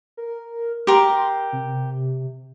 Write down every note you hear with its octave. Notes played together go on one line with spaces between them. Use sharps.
A#4
G4 A#4 C6
C3